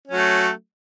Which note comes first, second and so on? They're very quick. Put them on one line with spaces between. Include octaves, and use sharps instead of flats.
C#4 F#3 A3